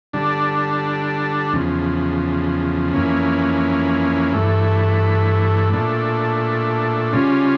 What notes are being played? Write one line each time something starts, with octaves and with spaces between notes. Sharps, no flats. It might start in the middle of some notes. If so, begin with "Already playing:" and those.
D3 G3 D4
E2 C#3 F3
F2 E3 A#3 C#4
G2 E3 A3
A#2 A3 D4
C#3 G3 C#4 F4